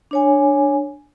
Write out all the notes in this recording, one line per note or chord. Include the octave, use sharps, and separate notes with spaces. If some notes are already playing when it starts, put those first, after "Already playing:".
D4 C#5 G#5